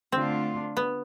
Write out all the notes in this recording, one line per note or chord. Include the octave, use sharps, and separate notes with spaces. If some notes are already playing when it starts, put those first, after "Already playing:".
D3 A3 C4 D4 F4
B3